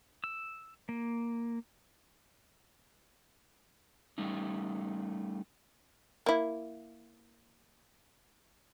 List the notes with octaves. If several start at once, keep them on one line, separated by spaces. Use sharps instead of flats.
E6
A#3
G3 A3 C#4 D#4
A#3 E4